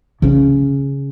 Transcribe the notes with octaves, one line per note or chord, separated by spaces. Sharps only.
C#3 C#4